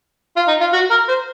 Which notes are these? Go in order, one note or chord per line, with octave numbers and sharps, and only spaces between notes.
F4
D#4
F4
F#4
A#4
C5